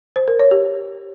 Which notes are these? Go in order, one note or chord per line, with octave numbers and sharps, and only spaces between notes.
C5
A#4
C#5
G4